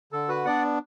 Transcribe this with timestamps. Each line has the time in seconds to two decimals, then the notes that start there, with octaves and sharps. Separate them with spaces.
0.12 D3 A4
0.29 F#4 B4
0.45 B3 D4 D5 F#5